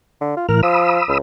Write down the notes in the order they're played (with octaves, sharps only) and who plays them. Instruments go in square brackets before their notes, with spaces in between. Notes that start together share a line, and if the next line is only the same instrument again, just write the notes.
[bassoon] D3
F4
[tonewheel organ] A2 E3 F6 [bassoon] A#4
[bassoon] F3 [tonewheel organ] B5 D#6 E6
[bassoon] C#2